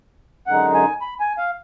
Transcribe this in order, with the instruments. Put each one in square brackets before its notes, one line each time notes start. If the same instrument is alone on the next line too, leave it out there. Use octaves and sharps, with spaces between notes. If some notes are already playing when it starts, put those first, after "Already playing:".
[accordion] F#2 D3 G#3 D#4 F#5
G#5
B5
G#5
F5